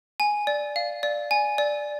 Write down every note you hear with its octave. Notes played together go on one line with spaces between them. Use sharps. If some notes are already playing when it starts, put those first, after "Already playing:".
G#5
D5
F5
D5
G#5
D5